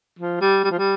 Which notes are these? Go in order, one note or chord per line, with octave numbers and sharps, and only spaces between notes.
F3
G3
G3
F3
G3